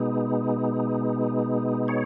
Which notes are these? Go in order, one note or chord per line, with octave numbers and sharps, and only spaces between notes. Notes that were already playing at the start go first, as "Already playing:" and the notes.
Already playing: B2 G#3 B3 D#4
C#5